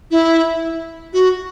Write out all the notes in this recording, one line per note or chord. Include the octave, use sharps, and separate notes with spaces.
E4
F#4